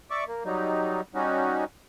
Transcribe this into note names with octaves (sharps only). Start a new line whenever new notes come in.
D5 E5 C#6 D6
A#3
F#3 G3 D#4
G3 C#4 D#4 F#4